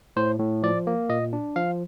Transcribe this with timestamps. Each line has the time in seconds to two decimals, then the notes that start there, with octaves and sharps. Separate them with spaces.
0.16 A2 C5
0.39 A2
0.63 F3 D5
0.87 A#3
1.09 A#2 D#5
1.33 D4
1.56 F3 F5